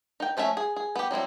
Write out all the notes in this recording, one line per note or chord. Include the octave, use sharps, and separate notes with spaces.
D#4 G5
F3 A3 C#4 F#4 E5
G#4
G#4
B3 G4
F#3 G3 C4 E4